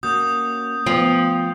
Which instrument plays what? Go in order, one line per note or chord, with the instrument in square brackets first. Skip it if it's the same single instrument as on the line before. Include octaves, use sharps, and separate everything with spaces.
[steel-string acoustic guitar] A#3 C#4 F#4 [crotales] D#6 G6
[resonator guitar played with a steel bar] F3 [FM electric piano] A3 B3 [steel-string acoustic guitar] G5